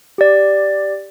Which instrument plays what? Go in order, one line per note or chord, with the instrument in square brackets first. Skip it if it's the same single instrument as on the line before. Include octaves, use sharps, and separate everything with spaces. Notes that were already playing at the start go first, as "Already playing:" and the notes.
[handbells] G4 D5